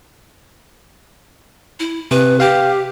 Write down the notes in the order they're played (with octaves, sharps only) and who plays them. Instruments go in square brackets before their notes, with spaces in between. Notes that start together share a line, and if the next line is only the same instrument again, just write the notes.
[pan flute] E4
[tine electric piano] C3 [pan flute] B4
[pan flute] G4 [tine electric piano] F5 G5